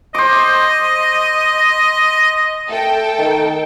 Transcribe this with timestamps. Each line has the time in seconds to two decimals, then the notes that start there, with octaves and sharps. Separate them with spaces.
0.15 C5 D#5 D6
2.70 A3 A4 G5
3.19 D#3